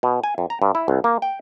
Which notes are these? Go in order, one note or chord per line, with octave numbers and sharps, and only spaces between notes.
B2
G#5
F2
A#5
G2
E4
C2
A#3
G5